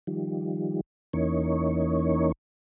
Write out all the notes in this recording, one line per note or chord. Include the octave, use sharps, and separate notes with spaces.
D#3 F3 G3
E2 E3 A#3 C#4 D#4 C#5